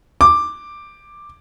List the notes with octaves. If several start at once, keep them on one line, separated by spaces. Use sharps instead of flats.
D6